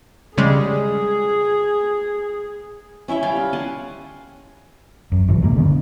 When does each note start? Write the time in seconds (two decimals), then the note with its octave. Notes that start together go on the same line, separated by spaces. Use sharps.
0.38 C#3 G3 G#3 G#4
3.08 C#4 E4 C#5 E5
3.23 G3 F5 G5 A5
3.36 F4
3.53 F#5 G#5 A5 C6
5.12 F#2
5.28 G1 G2 B2 E3
5.42 D#1 G#3 A#3
5.56 D3 D#3 B3 D4